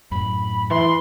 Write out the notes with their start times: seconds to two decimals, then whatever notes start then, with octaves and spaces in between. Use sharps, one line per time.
0.12 F#2 A2 B5
0.70 E3 C6